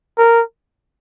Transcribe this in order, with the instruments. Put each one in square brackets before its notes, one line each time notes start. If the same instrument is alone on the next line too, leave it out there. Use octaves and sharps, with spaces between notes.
[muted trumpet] A#4